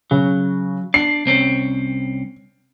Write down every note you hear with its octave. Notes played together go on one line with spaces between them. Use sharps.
C#3 F#3
D4 C7
C2 C4 C#4